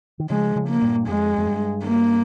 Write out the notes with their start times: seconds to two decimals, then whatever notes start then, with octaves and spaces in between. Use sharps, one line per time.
0.19 D#3
0.30 C#3 F3 G#3
0.55 C#3 F3
0.69 A#3
0.82 G2 A#2
1.07 F2 G#3
1.37 F2
1.46 G2
1.85 A#3